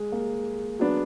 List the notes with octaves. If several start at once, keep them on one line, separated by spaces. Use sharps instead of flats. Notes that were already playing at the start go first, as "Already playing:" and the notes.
Already playing: G#3
A#3
F#3 B3 D4